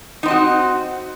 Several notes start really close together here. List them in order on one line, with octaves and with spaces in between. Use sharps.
D#4 C4 D#5 F#4